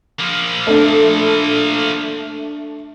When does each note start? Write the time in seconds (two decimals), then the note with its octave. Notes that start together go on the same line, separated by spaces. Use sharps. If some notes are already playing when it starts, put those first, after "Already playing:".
0.20 F3 A#3
0.67 A3 D4